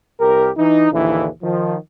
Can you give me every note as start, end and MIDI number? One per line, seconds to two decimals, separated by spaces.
0.20 0.50 36
0.20 0.50 67
0.20 0.50 70
0.57 0.88 52
0.57 0.88 63
0.92 1.29 34
0.92 1.29 39
0.92 1.29 50
0.92 1.29 52
0.92 1.29 64
1.43 1.76 51
1.43 1.76 53